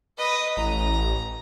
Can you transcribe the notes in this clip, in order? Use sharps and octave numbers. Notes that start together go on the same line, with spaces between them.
B4 D#5
A1 A#5